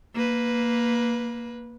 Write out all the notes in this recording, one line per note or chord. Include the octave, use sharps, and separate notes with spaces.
A#3 B4